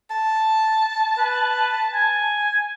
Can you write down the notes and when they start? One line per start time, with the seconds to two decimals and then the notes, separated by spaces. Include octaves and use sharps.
0.10 A5
1.18 B4
1.94 G#5